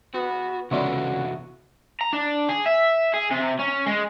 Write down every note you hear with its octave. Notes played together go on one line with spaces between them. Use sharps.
B3 F#4
C#2 C3 E3 B3 F#4 A4 D5 E5
A#5
D4
G#4
E5
G#4
C3
C#4
G#3